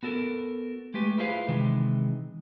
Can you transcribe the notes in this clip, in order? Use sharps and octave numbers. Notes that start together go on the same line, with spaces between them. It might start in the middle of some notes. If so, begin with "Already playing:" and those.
B3 F#4 A4 A#4
G#3 A3 G4 B4
E4 F4 G#4 B4 C5 F5
C3 D#3 E3 G#3